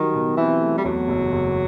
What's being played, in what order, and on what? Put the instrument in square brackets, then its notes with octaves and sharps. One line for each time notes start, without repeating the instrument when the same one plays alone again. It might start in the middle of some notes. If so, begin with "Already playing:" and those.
Already playing: [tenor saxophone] D#3 [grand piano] F#3 G3
[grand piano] B2
[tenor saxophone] E3 [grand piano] C4
[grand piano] A3
[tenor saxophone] G3
[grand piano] E2 [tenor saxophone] F#3
[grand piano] F#1
F#1